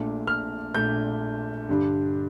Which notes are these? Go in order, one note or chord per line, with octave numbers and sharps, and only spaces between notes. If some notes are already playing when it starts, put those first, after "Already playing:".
Already playing: A#1 A#2 A3 D4
F6
A#1 A#2 A3 D4 G6
G2 D3 G3 D4